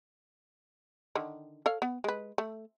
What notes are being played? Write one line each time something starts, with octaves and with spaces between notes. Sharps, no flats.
D3 D#3
A4 C#5 F5
B3
G#3 B4
A3